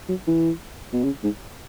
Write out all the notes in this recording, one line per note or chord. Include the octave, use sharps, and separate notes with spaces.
F#3
E3
B2
C#3
G#2